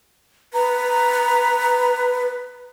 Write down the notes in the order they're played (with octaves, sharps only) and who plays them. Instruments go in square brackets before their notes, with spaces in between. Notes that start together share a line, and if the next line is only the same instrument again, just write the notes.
[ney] B4 [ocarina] A#5